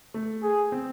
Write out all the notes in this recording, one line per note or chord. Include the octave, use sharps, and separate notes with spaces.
A3
G#4
C4